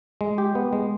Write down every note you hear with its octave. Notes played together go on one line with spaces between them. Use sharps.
G#3
G4
B3
G#3